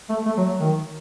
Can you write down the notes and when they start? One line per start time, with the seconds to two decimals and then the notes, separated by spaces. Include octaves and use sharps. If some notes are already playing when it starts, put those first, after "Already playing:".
0.09 A3
0.26 A3
0.37 F#3
0.60 D#3